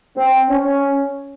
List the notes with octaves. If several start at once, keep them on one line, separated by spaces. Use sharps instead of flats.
C4
C#4